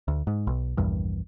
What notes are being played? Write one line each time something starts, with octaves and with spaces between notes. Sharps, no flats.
D2
G#2
B1
A#1 E2 G2